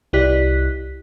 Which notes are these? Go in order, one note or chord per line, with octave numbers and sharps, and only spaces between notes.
C2 E4 G4 D5 F#6 B6